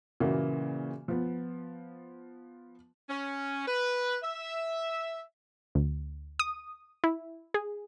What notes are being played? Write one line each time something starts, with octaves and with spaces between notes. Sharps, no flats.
A#2 C#3 E3 A#3 F#4
F3 B3
C#4
B4
E5
D2
D#6
E4
G#4